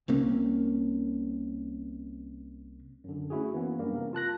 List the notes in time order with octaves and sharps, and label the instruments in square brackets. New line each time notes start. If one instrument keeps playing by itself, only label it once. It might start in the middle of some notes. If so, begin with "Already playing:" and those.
[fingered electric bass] C2 C3 A#3 C#4
[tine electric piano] F#2 D3
A3 C#4 E4 F#4 G#4
E3 A#3 B3 C#4
F#2 G3 A#3 D4
C3 A#4
F4 A5 F#6 A#6